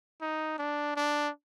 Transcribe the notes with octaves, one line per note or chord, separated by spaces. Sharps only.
D#4
D4
D4